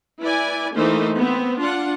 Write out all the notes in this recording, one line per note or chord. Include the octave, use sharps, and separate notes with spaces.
E4 B4 D5 G#5
E3 A3 A#3 D#4 C5
B3 C4
D4 F4 F#5